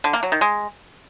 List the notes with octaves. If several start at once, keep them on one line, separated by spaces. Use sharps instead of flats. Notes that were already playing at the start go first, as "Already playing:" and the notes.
D3
A#3
F#3
D#3
G#3